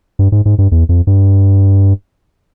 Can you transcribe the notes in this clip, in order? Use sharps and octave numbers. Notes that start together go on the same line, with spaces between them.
G2
G#2
G#2
G2
E2
F2
G2